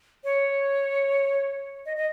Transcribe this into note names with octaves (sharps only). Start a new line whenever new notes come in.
C#5
D#5
D#5